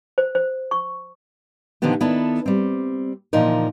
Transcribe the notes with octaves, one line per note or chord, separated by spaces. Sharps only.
C5
C5
C#6
A#2 D3 D#3 F3 B3 G4
D#3 B3 D4 E4 A4
G3 C4
A#2 D3 E3 F3 D#4 A#4